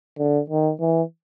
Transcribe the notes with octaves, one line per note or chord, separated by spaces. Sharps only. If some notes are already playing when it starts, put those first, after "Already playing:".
D3
D#3
E3